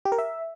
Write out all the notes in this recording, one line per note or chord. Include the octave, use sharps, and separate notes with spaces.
G4
A#4
E5